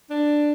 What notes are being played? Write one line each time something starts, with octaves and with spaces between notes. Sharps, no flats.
D4